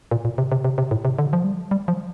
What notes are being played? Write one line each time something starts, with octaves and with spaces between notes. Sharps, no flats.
A#2
A#2
C3
C3
C3
C3
A2
C3
D3
F3
G3
G3
F3